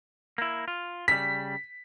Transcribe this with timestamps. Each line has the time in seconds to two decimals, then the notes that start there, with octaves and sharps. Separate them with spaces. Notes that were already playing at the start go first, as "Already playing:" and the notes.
0.38 A#3 E4
0.68 F4
1.08 C#3 G3 B6